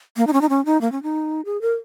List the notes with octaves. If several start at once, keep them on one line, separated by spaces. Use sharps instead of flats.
A#3
D#4
C#4
D#4
C#4
D#4
A#3
C#4
D#4
G#4
A#4